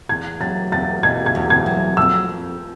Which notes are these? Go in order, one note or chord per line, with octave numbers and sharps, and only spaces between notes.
E2 G#6
F#3 A6
E2 A6
B2 G#6
G#6
E2
G#6
F#3
F2 E6
F3